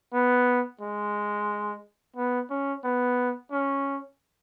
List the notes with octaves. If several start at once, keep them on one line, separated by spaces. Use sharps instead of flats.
B3
G#3
B3
C#4
B3
C#4